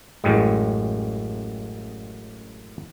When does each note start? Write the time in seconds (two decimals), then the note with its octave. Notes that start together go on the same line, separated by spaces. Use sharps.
0.24 A1 F#2 A2 G3 G#3